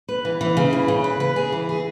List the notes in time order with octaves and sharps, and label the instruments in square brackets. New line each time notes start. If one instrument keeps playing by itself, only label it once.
[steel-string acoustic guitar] B4
E3
E3
C#3
E3
C#3
B4
B4
G#4
E3
G#4